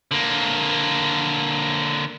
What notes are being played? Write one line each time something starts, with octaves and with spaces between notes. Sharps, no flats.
D3 A#3